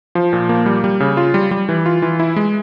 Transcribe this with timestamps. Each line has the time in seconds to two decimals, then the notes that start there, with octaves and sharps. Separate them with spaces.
0.15 F3
0.33 A#2
0.49 A#3
0.66 G3
0.84 G3
1.00 C#3
1.17 F4
1.34 G3
1.51 G3
1.69 E3
1.86 F4
2.02 E3
2.20 E4
2.36 G#3